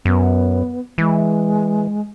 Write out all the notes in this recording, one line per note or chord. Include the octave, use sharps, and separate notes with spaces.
F#2 B3
E3 G#3